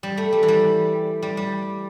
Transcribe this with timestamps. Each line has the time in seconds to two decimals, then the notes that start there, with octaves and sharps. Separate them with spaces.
0.03 G3
0.17 A3
0.33 G3
0.43 E3
0.48 G3
1.22 G3
1.37 G3